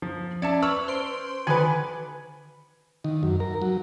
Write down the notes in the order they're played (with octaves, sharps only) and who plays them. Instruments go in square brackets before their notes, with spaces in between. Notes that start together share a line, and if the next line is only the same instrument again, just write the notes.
[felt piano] F3
[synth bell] C#4 [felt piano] D5 E5 A5
[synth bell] B4 [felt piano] C#6 E6 F6
[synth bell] C5 C6 D7
[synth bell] D3 D#3 F#4 [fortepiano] B4 G#5
[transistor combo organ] D#3
F#2
A#4
F#3